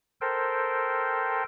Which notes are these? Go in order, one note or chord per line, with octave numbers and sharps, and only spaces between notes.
A4 A#4 C5 G5